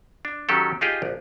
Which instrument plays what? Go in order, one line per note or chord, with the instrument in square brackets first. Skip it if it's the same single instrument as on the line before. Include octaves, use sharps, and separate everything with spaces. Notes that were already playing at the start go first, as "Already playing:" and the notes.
[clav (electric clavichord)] D4
D#3 F#3 C#4 G4 A4
D#4 F4 G4 G#4 D#5
A#1